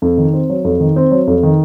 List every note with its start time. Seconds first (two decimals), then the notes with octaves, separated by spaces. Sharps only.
0.02 F2
0.17 D#3
0.34 C4
0.50 F#3
0.64 F2
0.80 D#3
0.96 C4
1.11 F#3
1.27 F2
1.43 D#3